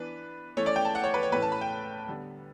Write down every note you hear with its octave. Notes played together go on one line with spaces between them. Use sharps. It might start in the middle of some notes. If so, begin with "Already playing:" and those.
Already playing: E3 B3 D4 B4
E3 A3 C#4 C#5
D5
G5
A5
F#5
C#5
B4
C#5
A2 E3 A3 C#4 B4
A5
B5
G5
D3 G3 B3